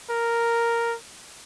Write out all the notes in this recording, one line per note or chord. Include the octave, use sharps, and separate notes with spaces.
A#4